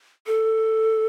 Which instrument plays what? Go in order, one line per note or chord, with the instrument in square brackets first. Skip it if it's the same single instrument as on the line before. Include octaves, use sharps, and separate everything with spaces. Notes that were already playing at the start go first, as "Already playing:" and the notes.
[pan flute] A4